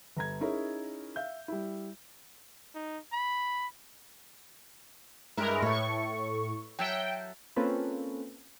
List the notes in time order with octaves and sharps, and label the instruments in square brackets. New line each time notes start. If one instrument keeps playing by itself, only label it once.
[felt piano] G1 A#5 G#6
C#4 D#4 E4 G#4 A#4 C#5
E5 F5 G6
G3 E4
[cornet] D#4
B5
[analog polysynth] G2 G#3 A#4 [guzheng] E4 B4
[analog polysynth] A2 C#6 [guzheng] A4 C#5
[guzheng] F#3 A4 E5 [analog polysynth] G5
[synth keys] A#3 C4 C#4 F4 A4 B4